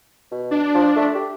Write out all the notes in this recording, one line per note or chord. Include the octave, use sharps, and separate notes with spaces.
B2
D4
F3
A3
G4